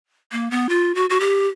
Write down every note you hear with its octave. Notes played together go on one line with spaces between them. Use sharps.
A#3
B3
F4
F#4
F#4
G4